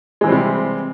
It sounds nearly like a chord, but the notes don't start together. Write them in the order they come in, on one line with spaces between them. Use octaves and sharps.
G#3 E3 C4 G3 C3